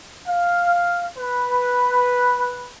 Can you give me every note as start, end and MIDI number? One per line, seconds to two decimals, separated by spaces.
0.28 1.07 77
1.18 2.70 71